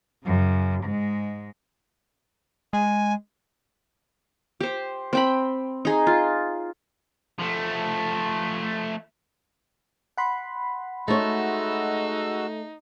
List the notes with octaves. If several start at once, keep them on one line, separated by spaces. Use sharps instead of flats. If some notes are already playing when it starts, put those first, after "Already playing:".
F#2 C#3
G#2 G#3
G#3 G#5
G4 C5
C4 G5 B5
D#4 G#4
F4
F3 A3
F#5 B5 C6
G#3 A3 D#4 F#4 C#5 E6